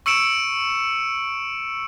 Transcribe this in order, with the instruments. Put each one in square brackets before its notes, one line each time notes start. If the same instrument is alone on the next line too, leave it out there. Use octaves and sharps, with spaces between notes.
[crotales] C#6 E6 C#7 D7 E7